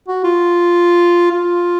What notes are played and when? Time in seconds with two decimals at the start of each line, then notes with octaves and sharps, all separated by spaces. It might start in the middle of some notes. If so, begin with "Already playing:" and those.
0.08 F#4
0.24 F4
1.31 F4